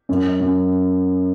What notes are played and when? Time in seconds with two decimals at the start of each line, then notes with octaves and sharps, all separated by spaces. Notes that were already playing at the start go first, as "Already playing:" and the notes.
0.09 F#2
0.40 F#2